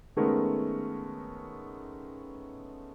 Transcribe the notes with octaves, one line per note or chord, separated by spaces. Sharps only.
D#3 G#3 A3 B3 C#4 A#4